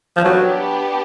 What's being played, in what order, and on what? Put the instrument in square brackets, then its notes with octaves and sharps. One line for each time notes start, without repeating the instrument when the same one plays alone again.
[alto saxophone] F3
[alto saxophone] F#3 [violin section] B3 D4 G4